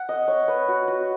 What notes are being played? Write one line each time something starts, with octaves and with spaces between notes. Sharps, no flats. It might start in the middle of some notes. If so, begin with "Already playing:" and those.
Already playing: F#5
D#5
C#5
B4
F#4
F#4